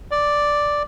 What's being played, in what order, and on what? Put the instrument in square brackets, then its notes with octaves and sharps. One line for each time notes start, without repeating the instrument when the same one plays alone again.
[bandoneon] D5